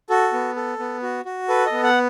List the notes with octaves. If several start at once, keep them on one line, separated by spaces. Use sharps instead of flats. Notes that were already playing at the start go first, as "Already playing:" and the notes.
F#4 A4
B3
A4
B3
F#4
F#4
A4 B4
D#5
B3
F#5